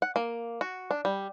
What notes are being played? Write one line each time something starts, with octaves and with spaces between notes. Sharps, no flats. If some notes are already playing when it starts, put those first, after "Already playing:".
F#5
A#3
F#4
D4
G3